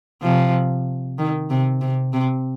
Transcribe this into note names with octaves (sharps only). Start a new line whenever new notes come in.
C3 F3
D#3
C3
C3
C3